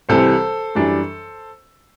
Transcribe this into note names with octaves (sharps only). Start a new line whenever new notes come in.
C2 C3 E3 G3 A4 C5
F#2 E3 G3 D4